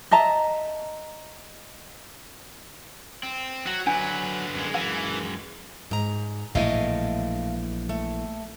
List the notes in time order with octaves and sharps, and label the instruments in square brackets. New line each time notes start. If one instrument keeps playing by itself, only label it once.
[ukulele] D#5 E5 A5 A#5
[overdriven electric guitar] C4
[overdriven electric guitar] F#3 [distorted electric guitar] F#4
[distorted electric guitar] D3 B4 [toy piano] D4 G#5
[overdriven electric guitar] F#2 G#3
[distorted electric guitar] E3 [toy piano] F5
[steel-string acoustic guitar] G#2 A#5
[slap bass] A#1 A2 E3 [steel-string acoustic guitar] A3 D#5 F5
[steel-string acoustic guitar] A3